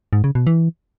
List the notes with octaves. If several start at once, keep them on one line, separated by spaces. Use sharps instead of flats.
G#2
C#3
B2
E3